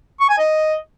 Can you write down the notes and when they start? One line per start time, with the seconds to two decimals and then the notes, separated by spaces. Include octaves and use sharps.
0.20 C#6
0.30 G#5
0.39 D#5